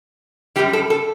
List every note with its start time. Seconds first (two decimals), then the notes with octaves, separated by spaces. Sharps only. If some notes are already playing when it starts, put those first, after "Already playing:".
0.56 F#2 E3 G3 G4
0.73 A4
0.90 A4